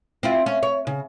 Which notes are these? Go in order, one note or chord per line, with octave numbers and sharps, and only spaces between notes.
C4 E4 F4
C#4
C#5
C#3